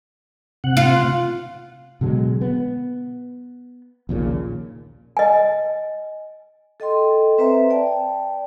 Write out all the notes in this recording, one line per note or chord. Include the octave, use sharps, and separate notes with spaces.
C3 F#5
F4
B2 D3 F#3 G#3
B3
A#1 D#2 A#2 C#3
D#5 G#5
A4 D#5 G5 C6
C4 B4 C5 E5 A#5
D5 G5 A5